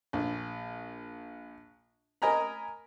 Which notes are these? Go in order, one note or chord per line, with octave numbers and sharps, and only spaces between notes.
A#1
A#4 D#5 G#5 A#5 B5